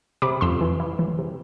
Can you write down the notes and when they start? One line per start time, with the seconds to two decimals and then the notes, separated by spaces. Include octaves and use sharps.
0.22 C3 B5 D6
0.41 F2 C6 E6
0.61 E3
0.80 E4
0.99 E3
1.18 C3